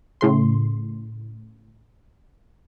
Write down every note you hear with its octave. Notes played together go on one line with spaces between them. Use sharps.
A2 C#3 C6